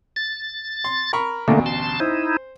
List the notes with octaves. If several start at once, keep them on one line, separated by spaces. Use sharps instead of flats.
A6
C6
A#4 B5 C#6
A1 D2 B2 D3 A3 A#3
A5 C6
D#4 E4 C5